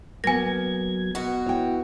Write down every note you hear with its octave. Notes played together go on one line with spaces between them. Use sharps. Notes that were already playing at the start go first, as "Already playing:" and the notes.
F#3 A#3 B3 G#5 G#6 A#6
B2 F#4
E4 C#5 G5